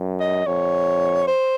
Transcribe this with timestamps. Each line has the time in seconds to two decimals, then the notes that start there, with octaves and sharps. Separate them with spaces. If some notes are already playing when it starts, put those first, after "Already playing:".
Already playing: F#2
0.20 D#5
0.47 F2 C#5
1.27 C5